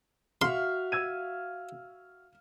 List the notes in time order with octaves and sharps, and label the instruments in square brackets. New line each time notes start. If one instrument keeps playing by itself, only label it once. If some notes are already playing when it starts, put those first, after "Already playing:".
[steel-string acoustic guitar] F#4 E5 [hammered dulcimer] F5 [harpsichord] C6
[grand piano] E6 G#6 D#7